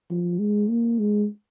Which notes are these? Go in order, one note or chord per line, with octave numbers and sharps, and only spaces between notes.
F3
G#3
A#3
G#3